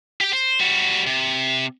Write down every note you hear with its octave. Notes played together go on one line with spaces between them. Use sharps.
G4 G5
C5
G3 F#4
C3